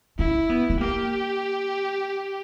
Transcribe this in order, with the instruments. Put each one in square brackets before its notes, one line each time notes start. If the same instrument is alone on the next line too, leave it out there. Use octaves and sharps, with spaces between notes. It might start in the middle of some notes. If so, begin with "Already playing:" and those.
[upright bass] C#4 [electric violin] E4
[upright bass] B3
B3
[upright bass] A#3 [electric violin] G4